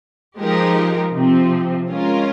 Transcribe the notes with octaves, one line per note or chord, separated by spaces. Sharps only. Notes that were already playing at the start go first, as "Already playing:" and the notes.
F3 G#3 D#4 G4 A#4
C3 F3 C4
G#3 C#4 F4 A#4